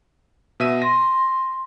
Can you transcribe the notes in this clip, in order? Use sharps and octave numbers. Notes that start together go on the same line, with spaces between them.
B2 E5 D#7
C6 A#6